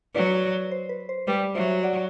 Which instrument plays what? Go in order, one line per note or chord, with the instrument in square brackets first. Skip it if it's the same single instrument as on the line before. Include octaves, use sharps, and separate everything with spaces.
[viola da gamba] F#3 [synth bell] B4 D5
[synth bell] C5
B4
C5
[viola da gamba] G3 [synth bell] B4 D5
[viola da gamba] F#3 [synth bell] C5 E5
[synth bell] D5 F#5